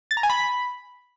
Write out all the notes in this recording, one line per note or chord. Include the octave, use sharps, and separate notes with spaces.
A6
A#5
G#5
B5